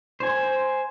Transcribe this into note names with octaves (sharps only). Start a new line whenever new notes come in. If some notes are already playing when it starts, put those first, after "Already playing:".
C5 G#5